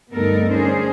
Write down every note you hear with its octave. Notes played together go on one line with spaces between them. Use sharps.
D2 G2 B3 D#4 A4 A#4
C#4 D4 G#4 C5